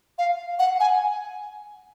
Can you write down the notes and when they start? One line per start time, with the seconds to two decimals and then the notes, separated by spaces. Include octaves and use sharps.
0.18 F5
0.59 F#5
0.80 G#5